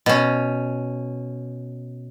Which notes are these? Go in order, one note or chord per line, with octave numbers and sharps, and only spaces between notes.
B2 C#4